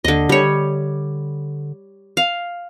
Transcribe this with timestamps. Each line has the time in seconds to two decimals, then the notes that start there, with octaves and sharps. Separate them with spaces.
0.04 D#2 D3 D#5
0.29 D3 G3 C#5
2.17 F5